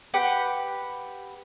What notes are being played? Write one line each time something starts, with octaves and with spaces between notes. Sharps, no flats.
G4 B4 F#5